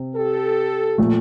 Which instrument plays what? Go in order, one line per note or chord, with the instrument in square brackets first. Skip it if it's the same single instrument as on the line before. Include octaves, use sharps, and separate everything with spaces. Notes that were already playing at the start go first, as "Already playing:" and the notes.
Already playing: [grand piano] C3
[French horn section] G4 A4
[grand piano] A#2 F3 A3